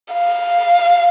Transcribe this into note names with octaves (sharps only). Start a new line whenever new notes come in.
F5